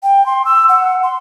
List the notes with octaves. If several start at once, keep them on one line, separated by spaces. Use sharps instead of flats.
G5
C6
E6
F#5
C6